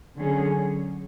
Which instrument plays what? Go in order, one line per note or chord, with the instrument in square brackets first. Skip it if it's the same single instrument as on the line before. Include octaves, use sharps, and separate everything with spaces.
[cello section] D3 F#3 C#4 G#4